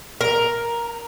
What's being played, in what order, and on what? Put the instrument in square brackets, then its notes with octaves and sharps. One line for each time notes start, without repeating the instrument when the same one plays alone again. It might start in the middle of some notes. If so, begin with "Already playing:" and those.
[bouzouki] A#4